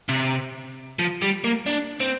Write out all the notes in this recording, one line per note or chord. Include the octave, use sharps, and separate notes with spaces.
C3
F3
G3
A#3
D4
C4